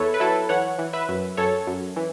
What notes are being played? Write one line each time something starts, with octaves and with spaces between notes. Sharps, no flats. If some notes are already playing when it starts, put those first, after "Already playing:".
Already playing: E2 A4 B4 C#5 E5
B4
F#3 E4 A4
E3 C#5 F#5
E3
B4 E5
F#2
F#2 A4 C#5
F#2
E3